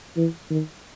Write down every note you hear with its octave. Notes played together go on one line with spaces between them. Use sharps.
E3
D#3